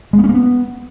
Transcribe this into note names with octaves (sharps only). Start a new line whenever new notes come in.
G#3
B3
C#4
A#3
B3